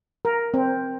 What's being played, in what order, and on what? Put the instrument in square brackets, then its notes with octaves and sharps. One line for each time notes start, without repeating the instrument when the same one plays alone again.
[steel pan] A#4
C4